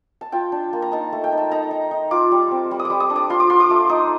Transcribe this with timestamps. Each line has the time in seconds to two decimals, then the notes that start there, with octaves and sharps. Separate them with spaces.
0.21 A5
0.32 F4 G5
0.52 D4
0.73 A#3
0.82 A#5
0.92 D#4 A5
1.12 A3
1.24 G5
1.32 D#4
1.38 A5
1.51 D#4 A#5
1.71 D#4
1.91 D#4
2.11 F4 D6
2.32 G3
2.51 C4
2.71 G3
2.80 D#6
2.85 D6
2.90 G3
3.00 D#6
3.10 D4
3.16 D6
3.30 F4 C6
3.40 D6
3.50 F4 C6
3.60 D6
3.70 A3
3.89 D#4 D#6